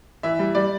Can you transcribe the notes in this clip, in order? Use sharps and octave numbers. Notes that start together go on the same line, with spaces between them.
E3 E5
G3
G3 D5